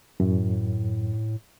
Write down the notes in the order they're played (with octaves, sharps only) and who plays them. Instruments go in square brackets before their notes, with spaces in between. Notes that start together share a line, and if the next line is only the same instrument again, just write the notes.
[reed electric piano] F#2 [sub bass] A2